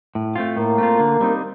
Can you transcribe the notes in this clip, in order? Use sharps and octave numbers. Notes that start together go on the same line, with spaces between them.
A2
A3 C4 F4
A2 A#3
A3 C4 F4
D3
G3 C4 D#4